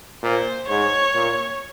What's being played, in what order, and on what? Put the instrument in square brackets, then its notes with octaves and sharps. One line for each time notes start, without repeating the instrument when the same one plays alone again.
[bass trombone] A#2 [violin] C5
[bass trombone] G#2 [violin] C#5
[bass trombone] A#2